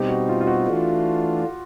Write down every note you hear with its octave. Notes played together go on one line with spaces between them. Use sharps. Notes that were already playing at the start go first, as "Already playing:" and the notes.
Already playing: B2 G3 C4 D#4 G4
F#4
F4
F4
F#4
E3 A3 D4 F4